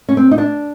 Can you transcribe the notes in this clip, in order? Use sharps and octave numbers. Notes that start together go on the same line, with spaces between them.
C#4
C4
D#4
D4